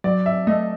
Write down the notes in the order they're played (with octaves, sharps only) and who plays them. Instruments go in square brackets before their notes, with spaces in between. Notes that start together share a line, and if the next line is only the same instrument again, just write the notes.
[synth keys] F#3 [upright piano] D5
[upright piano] E5
[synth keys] A3 [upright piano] D#5